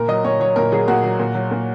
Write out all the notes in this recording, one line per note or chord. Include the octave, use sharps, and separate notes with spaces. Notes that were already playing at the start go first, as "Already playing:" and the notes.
Already playing: A#2 A#4
F#3 D#5
A#2 C#5
F#3 C#5
A#2 A#4
F#3 G#4
A#2 F#4
F#3
A#2
F#3
A#2